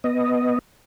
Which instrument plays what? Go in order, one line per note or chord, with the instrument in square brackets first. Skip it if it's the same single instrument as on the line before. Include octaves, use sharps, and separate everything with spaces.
[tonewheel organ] B3 D#5